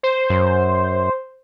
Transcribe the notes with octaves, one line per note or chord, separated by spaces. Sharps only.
C5
F#2